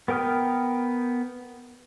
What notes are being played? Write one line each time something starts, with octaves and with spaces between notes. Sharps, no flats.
B3 A#4 G5 D#6 F6